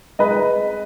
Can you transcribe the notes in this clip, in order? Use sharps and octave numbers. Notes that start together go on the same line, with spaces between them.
G#3 B4 D#5